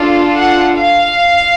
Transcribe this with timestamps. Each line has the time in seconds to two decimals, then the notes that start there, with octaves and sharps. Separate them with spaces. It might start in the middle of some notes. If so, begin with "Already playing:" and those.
Already playing: D4 F4 A4
0.39 F#5
0.77 F5